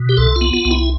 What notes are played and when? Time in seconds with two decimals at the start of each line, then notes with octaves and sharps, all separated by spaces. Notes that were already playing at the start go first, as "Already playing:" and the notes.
Already playing: B2
0.09 G4
0.17 C2 A4
0.36 F4
0.41 B3
0.53 F4
0.65 C2
0.71 E4